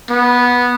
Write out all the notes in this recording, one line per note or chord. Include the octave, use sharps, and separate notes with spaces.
B3